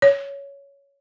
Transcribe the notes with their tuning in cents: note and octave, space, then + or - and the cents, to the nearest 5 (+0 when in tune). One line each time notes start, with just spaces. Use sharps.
C#5 +10